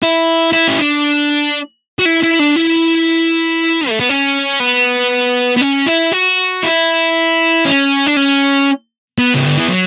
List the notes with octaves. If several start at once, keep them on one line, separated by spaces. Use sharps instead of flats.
E4
E4
C#4
D4
F#4
E4
E4
D4
E4
A3
B3
C#4
B3
B3
C#4
E4
F#4
E4
C#4
D4
C#4
B3
C#3
D3
E3
F#3